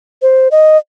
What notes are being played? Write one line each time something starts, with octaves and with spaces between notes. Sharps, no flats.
C5
D#5